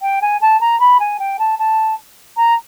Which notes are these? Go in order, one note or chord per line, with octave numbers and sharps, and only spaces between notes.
G5
G#5
A5
A#5
B5
G#5
G5
A5
A5
A#5